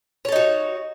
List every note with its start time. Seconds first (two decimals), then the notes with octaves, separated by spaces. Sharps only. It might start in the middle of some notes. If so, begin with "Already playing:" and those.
0.25 C#5
0.28 A4
0.32 D#4
0.36 F#4